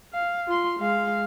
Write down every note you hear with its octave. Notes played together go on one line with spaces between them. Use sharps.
F5
F4 C6
G#3 F5